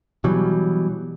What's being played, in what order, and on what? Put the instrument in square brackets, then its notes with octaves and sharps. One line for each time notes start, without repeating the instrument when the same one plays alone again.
[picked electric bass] B2 E3 F#3 G3